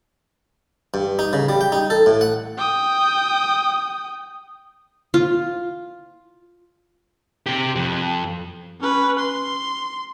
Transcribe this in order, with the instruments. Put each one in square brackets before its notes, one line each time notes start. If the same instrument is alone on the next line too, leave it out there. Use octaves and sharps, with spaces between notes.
[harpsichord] G2
D#4
C#3
G3
G5
D#4
A4
A2
F#5
[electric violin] G5 D#6
[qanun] F4
[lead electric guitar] C3 G4
F2 F3
[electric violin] C#4 B4
C6